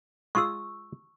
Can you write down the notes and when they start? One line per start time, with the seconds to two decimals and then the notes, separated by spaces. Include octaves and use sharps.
0.35 G#3 F4 G#4 C#6 E6